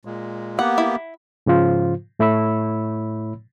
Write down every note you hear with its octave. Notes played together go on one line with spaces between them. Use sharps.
A#2 G#3
A#3 B3 G4 F#5
E4
G#2 C#3 F3 F4 C5
A2 A3 E4 C#5 B5 E6